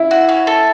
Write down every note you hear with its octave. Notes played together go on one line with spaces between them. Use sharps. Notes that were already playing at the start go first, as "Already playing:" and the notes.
Already playing: E4
F#4
C#4
A4